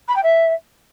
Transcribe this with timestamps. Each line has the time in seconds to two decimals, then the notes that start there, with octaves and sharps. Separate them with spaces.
0.08 B5
0.16 G5
0.23 E5